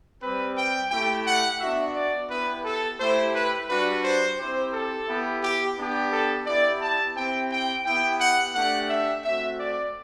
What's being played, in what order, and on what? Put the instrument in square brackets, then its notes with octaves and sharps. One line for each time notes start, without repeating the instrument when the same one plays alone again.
[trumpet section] G3 C4 G4 B4
G5
A3 E4 G4 G5
F#5
B3 D4 F#4 E5
D5
B3 E4 G4 B4
A4
A3 E4 G4 C5
B4
G3 D4 F#4 B4
C5
C4 E4 G4 C5
A4
B3 E4 G4
G4
B3 D4 G4
A4
B3 E4 G4 D5
A5
C4 E4 G4 G5
G5
B3 E4 G4 G5
F#5
A3 D4 G4 F#5
E5
A3 C4 F#4 E5
D5